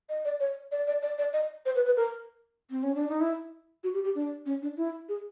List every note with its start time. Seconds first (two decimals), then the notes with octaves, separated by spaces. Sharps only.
0.09 D#5
0.25 D5
0.40 C#5
0.72 D5
0.87 D5
1.02 D5
1.18 D5
1.33 D#5
1.66 C5
1.76 B4
1.86 B4
1.97 A#4
2.70 C4
2.83 C#4
2.95 D4
3.08 D#4
3.21 E4
3.84 F#4
3.94 G4
4.04 G4
4.15 D4
4.46 C#4
4.62 D4
4.77 E4
5.09 G#4